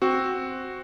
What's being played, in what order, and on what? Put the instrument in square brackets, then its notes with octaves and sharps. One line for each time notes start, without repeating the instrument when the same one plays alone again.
[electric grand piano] C4 F#4